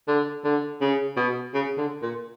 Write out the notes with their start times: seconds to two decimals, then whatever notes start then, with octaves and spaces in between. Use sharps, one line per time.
0.08 D3
0.45 D3
0.81 C#3
1.17 B2
1.54 C#3
1.77 D3
2.02 A#2